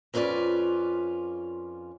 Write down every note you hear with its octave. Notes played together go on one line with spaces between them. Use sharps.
F2 C#4 F4 B4 D5